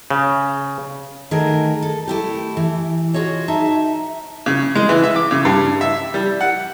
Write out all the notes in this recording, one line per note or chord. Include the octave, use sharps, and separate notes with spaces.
C#3
D#3 A3 G#4 A#4
A4
A3 E4 G4
E3
F4 F#4 G#4 C#5 D#5
D#4 E5 A5
C#3
G#3
E3
E5
D6
C#3
G2
E5
G3
F#5